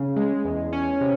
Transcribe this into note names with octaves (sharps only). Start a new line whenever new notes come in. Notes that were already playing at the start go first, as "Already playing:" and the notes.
Already playing: C#3
G#3
E2
C#4
C3